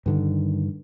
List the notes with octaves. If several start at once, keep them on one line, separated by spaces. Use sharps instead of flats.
G2 D3 D#3